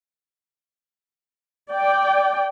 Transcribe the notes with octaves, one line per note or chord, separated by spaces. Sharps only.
D5 G5